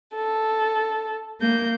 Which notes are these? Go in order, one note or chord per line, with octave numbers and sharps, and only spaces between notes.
A4
A#3 G6